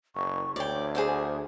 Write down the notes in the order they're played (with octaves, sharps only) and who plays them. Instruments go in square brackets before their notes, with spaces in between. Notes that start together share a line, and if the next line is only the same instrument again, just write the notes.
[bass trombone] F#1 [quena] C#6
[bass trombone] D2 [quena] C#5 [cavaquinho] D5 G5
[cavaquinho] G#4 C5 D6 [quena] F#5